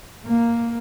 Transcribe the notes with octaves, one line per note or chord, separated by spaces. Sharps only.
A#3